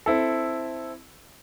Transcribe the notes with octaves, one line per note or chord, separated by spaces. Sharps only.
C4 E4 A4